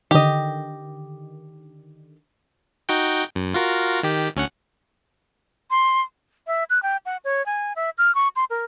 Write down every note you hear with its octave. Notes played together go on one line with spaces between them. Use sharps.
D3 D#3 G4 D#5
D#4 F#4 G5
F#2
F4 F#4 A#4
D#3 G4
D2 C#4 F#5
C6
E5
F#6
G5
F#5
C#5
G#5
E5
F6
C#6
C6
A#4